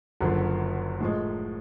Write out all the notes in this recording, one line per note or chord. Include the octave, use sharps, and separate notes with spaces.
F#1 F#2 D3 F3
A2 F3 G#3